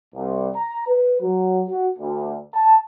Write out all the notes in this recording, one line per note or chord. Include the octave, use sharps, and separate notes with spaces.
C2
A#5
B4
F#3
F#4
D2
A5